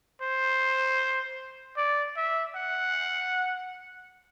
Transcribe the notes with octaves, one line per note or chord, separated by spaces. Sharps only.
C5
D5
E5
F#5